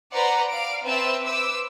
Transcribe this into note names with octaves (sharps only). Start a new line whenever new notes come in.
B4 C5 D5 F#5 A#5
D5 F5 D7
C4 B4 C5 E5 A5 E6
B4 C5 D6 E6